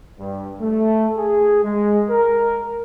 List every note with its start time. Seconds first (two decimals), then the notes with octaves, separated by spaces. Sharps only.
0.19 G2
0.61 A3
1.17 G#4
1.64 G#3
2.09 A#4